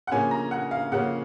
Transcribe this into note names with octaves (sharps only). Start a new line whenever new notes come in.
F#5
C#3 F3 A#3 C#4 G#5
A#5
F#5
F5
C#3 F3 A#3 C#4 F#5